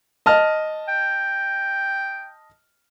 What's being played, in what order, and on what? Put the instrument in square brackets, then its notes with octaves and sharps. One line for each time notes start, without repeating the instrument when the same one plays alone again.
[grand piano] D#5 A5 F6
[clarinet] G5